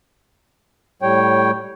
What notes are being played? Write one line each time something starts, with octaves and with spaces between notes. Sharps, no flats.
A2 G3 C#5 G5